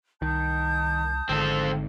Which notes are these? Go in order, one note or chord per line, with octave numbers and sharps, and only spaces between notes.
C2 D#3 A5 D#6 G6
G#1 D3 C4 A4